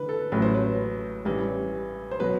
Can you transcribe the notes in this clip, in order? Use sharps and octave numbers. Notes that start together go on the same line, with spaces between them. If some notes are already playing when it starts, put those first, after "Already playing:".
Already playing: D3 B4
A4
A1 A2 F#3 B4
C5
B4
A1 G2 E3 G3
C5
B2 F#3 B4